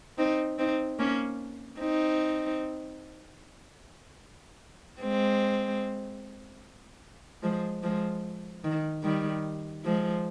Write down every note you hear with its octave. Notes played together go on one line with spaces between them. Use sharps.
C4 D#4
C4 D#4
A#3 C#4
C4 D#4
G#3 C4
F3 G#3
F3 G#3
D#3
D#3 G3
F3 G#3